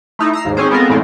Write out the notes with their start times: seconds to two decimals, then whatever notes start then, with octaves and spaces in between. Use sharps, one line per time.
0.19 A3 D#4 E4
0.33 A#5 E6 C7
0.45 D#2 G#2
0.57 C4 C#4 D#4 G#4 C5
0.70 G#3 B3 C4 F4 A4 A#4
0.89 E2 A2 G#3 A3 C4